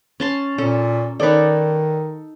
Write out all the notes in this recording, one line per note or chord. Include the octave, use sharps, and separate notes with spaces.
C#4 A5 C6
A#2 C#4 A4
D#3 D#4 A4 B4 C#5 D5